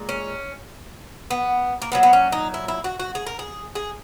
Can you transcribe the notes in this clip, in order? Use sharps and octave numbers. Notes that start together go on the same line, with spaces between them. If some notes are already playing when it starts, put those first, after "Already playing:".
Already playing: A#2 G#3
C#4
B3
A#3
A#2 F#3 B3
B3
C#4
D#4
E4
E4
F#4
F#4
G#4
A#4
G#4
G#4